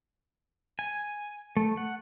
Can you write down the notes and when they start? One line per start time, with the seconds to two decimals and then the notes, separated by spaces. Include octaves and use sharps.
0.79 G#5
1.57 A3
1.77 F#5